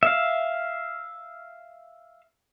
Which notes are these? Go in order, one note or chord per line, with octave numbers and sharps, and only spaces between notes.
E5 F5